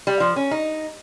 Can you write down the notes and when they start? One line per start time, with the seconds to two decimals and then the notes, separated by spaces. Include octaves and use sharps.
0.07 G3
0.20 F3
0.36 C#4
0.51 D#4